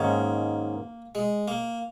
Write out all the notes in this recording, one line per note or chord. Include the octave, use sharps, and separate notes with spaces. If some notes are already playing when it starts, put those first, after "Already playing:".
Already playing: G#2 D#3 A#3 C#4
G#3
A#3